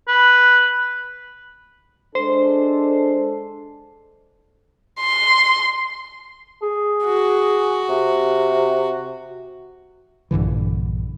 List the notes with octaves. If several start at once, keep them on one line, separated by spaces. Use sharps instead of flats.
B4
G#3 D4 A4 C5
C6
G#4
F#4
C3
A#1 G2 D3 E3